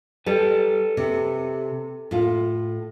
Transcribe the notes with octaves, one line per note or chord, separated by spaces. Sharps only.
G3 A4 B4
C3
A2 F4